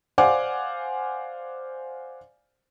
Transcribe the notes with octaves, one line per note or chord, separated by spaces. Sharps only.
C5 D5 F5 F#5 G#5 D6